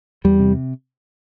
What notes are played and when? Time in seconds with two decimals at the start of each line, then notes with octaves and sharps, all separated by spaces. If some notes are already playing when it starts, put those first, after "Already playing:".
0.24 E2 G3
0.40 C3